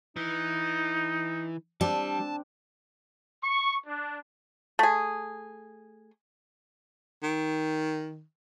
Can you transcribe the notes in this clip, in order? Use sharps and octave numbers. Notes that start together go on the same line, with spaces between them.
E3 D#4
G3 C4 D4 A5
C#6
D4
A3 G#4
D#3